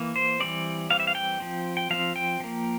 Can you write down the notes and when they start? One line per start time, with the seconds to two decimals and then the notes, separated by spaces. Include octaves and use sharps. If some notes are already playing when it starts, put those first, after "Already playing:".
Already playing: E3 A#3
0.16 C5
0.40 E3 G3 C4 D5
0.90 E3 G3 C4 F5
1.00 E5
1.07 F5
1.15 G5
1.40 F3 C4
1.77 G5
1.90 F3 C4 F5
2.16 G5
2.40 F3 A#3